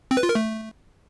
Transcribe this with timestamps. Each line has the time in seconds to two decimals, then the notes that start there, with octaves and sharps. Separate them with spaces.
0.11 C4
0.17 B4
0.23 F4
0.29 A#4
0.35 A3